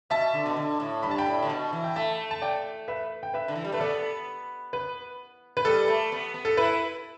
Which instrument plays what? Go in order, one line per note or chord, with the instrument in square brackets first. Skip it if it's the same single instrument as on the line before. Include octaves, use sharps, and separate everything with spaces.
[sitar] B2 [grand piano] E5 A5
[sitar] D3
B2
D3
A2
[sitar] G2 [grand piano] B5
[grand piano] A5
G5 B5
[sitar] A2
D3
B2
E3
[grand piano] G5
[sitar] A3 [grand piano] E5 A5
[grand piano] A5
D5 G5
B4 E5
G5
B4 E5
[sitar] D3
E3
G3
[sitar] A3 [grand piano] B4
[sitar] B3 [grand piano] A4 D5
[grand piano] B4
B4
[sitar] G3 [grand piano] A4
[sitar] A3
B3
B3
[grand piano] A4
[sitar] E4 [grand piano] B4